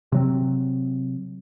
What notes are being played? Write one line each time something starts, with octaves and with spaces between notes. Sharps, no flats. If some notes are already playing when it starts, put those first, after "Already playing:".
C3 F#3 C4